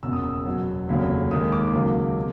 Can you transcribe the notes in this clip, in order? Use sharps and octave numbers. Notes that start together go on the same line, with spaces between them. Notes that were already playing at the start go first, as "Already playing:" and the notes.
F#1 E2 B2 E6
D#6
E6
E2 B2 F#3
F1 D#2 C#3 F#3
D#2 D#3 G#3 D#6
D6
C#2 C#3 F#3 A#3
C3